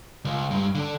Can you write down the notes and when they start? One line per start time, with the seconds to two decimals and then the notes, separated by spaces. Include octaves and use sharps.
0.25 C#2
0.51 G2
0.75 D3 D4